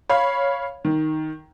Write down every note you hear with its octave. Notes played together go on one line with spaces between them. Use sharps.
C#5 F5 B5
D#3